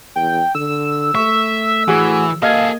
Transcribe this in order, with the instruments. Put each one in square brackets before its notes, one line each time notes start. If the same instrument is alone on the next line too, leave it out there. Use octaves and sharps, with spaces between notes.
[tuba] E2 [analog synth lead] G5
[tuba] D3 [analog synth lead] E6
[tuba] A3 [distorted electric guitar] E5 [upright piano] C#6
[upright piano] A2 F#4 G#4 [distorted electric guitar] E3
[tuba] A#3 [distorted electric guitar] G#4 A4 [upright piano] D#5 G#6 [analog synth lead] F5